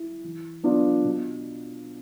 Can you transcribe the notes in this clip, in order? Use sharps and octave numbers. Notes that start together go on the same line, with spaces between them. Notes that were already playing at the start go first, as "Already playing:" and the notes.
Already playing: E4
E3
B3 D4 F4
B2